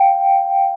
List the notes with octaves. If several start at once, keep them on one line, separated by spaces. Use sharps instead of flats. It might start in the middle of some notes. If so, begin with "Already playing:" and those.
Already playing: F5 G5